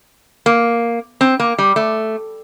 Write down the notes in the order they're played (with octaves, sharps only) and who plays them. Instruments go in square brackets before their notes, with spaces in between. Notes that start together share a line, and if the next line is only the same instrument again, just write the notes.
[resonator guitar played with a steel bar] A#3
C4
A#3
G3
A3